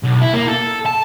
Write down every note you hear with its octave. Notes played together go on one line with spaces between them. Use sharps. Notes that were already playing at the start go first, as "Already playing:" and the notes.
B1
E4
A#3
A4
A5